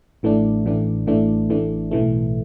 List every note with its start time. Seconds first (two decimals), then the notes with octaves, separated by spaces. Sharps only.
0.23 A1 A2 E3 A3 D4
0.65 A1 A2 E3 A3 D4
1.07 A1 A2 E3 A3 D4
1.50 A1 A2 E3 A3 D4
1.91 B1 A2 E3 A3